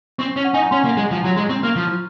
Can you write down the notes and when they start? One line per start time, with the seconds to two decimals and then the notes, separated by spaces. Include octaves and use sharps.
0.19 C4 C#6
0.36 C#4
0.45 F#5
0.54 D#4 G#5
0.62 A#5
0.71 C#4 C6
0.85 A#3
0.97 G#3
1.11 F3
1.24 F#3 A#5
1.36 G#3 C6
1.49 C4 C#6
1.63 A#3 F6
1.76 F3 F6